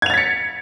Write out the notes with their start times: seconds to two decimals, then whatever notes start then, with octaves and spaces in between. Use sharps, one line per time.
0.02 G#6
0.06 F7
0.10 A6
0.14 B6
0.17 C#7